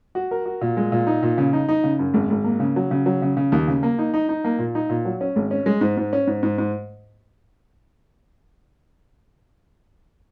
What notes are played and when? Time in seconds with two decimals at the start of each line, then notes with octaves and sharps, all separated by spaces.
0.15 F#4
0.31 A#4
0.46 F#4
0.61 A#2
0.77 G#3
0.92 A#2
1.07 D#4
1.23 A#2
1.38 C#3
1.53 D#4
1.69 D#4
1.84 C#3
1.99 F#2
2.14 G#1
2.30 G#1
2.44 A#3
2.60 C#3
2.76 F#3
2.91 C#3
3.06 F#3
3.22 C#3
3.37 C#3
3.52 D#2
3.68 C#3
3.83 A#3
3.99 D#4
4.14 D#4
4.29 D#4
4.44 A#3
4.59 A#2
4.75 D#4
4.89 A#2
5.05 F#3
5.21 C#4
5.36 G#1
5.51 C#4
5.66 G#3
5.81 G#2
5.97 G#2
6.13 C#4
6.27 G#2
6.43 G#2
6.58 G#2